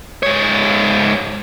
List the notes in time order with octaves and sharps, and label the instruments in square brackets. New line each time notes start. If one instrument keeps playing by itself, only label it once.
[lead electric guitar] G#2 C#5